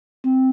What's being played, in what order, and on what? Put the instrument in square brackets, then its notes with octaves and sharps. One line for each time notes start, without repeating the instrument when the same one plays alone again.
[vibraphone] C4